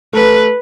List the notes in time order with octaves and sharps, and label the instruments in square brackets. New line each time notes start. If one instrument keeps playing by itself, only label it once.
[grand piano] A3 [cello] B4